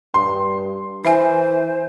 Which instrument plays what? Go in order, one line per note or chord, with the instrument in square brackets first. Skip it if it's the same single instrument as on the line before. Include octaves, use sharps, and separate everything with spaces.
[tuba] G2 [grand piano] C6
[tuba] E3 [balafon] E4 E5 G#5 [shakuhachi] C5